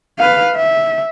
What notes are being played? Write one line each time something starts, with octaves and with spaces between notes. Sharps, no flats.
B4 F5
E5